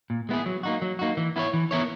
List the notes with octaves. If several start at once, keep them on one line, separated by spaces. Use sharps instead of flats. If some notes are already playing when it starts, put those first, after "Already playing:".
A#2
G#3 B3 E4 G#4
F#3
A#3 D#4 F#4
F#3
A#3 D#4 F#4
E3
B3 E4 A#4 C#5
E3
B3 E4 A#4 C#5